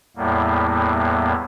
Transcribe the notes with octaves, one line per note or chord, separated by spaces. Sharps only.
E2 A2 G3 A#3 B3